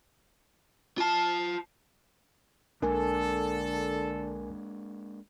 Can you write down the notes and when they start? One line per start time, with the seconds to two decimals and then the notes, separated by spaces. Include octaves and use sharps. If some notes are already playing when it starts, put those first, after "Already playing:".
0.98 F4 A5
2.82 B1 D3 G#3 A#3 D4 A4 A#4 G#5